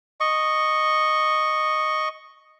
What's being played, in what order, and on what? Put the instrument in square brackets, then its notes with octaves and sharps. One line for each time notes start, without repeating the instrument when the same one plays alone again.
[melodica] D#5 C#6